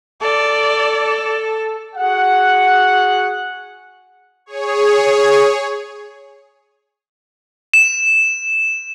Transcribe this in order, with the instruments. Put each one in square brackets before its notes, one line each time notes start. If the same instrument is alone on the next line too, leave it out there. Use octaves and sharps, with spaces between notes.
[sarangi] A4 [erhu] D5
[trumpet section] F#4 G#4 F#5
[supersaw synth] G#4 C#5
[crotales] E7